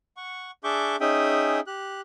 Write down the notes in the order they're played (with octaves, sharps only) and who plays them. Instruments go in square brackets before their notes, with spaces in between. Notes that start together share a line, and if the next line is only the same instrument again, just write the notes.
[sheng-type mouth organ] F#5 C#6
D4 G#4 E5 C#6 D6 G6
C#4 D#4 G#4 E5 G5 D#6
G4 F#6